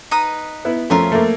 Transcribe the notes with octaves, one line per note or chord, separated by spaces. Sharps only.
D#4 B4 D#6
B3 E4
F2 A3 C#4 F4 A#4 E5
A3 A#3